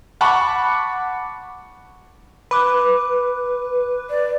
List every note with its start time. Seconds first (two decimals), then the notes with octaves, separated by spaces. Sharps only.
0.21 F#5 A5 B5 C#6 D6
2.51 B4 B5 D6
4.10 D5